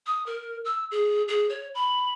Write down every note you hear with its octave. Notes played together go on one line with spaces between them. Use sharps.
D#6
A#4
E6
G#4
G#4
C#5
B5